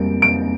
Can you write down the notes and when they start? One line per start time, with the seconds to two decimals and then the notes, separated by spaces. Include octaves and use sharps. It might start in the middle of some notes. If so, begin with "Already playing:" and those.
Already playing: F2 G3 A#3 D7
0.22 D7